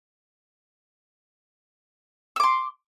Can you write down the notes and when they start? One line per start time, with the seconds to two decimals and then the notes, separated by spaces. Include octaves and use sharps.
2.36 E6
2.40 D6
2.43 C6